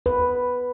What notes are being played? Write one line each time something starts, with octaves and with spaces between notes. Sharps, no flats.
B4